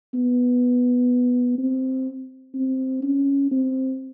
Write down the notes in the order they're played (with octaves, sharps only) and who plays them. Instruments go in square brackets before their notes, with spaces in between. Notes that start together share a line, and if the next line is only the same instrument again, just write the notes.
[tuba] B3
C4
C4
C#4
C4